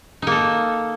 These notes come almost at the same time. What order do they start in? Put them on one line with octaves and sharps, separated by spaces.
D#4 A#3 A4